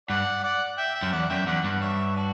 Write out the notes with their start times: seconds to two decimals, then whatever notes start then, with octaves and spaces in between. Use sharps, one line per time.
0.09 G2 D5 F#5
0.43 D5 F#5
0.78 E5 G5
0.95 E5 G5
1.02 F#2
1.12 E2 D5 F#5
1.30 F#2 E5 G5
1.47 E2 D5 F#5
1.64 G2 D5 F#5
1.81 C#5 E5
2.16 D4 F#4